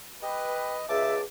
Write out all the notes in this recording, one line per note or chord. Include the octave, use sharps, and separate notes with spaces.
G4 B4 D#5
C#2 G#4 E5 A5 D6